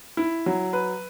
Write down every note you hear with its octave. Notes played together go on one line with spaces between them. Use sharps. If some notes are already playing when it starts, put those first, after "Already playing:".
E4
F#3
B4